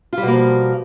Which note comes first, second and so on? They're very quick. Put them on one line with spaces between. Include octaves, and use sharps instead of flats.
F4 G3 B2 A#3 F3